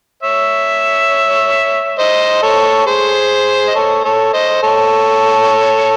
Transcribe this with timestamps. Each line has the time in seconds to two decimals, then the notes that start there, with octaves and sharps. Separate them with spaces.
0.23 C#5 E5
1.99 C5 D#5
2.43 A4 C#5
2.86 G#4 C5
3.68 D#5
3.75 A4 C#5
4.04 A4 C#5
4.33 C5 D#5
4.63 A4 C#5